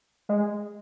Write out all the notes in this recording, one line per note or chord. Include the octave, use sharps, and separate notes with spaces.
G#3